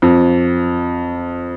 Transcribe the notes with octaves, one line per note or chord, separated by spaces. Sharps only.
F2